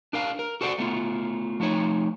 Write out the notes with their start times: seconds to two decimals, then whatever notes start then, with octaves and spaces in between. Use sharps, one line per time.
0.13 D4 A#4 F5
0.39 A#4
0.61 F#4 A4 C5 D5 F#5
0.78 A3 B3 F4
1.60 F3 A3 D#4 C#5